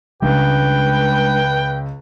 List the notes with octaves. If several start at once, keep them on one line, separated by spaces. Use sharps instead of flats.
C#2 G3 G#3 D4 B4 G5